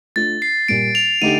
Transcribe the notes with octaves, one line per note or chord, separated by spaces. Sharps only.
A3 D4 F4 A6
C7
A#2 G3 A#3 D7
F7
D3 A3 D#4 G4 D#7